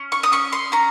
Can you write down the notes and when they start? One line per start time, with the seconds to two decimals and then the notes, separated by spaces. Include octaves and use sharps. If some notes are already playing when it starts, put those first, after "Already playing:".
Already playing: C#4
0.12 C#6
0.23 D#6
0.32 C#4 C#6
0.52 C6
0.72 C#4 A#5